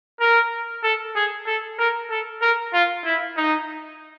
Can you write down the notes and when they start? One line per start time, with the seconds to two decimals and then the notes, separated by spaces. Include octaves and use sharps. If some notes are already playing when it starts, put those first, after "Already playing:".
0.20 A#4
0.83 A4
1.15 G#4
1.47 A4
1.79 A#4
2.10 A4
2.42 A#4
2.73 F4
3.05 E4
3.37 D#4